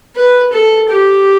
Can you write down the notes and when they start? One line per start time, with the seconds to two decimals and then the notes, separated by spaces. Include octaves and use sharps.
0.16 B4
0.53 A4
0.90 G4